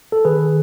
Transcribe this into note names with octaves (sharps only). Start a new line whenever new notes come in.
A4
D#3 G#4 B4